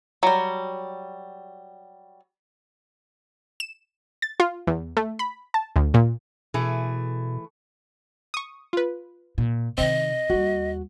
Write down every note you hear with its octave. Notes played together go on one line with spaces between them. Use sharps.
F#3 G3
E7
A6
F4
E2
A3
B5
A5
D2
A#2
B2 E3 A3 G#4
C#6 D#6
F4 B4
A#2
C3 D#3 C4 D#5
D#2 G3 F#4